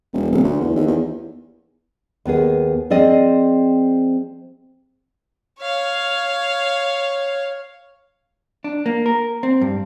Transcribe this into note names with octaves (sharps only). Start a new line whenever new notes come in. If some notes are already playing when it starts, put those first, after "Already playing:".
E1
D1
D2
E2
D#2
E2
D#2 B3 G#4
F3 C4 G#4 D5 D#5
C#5 F5
D4
A#3
A#4
C4
G2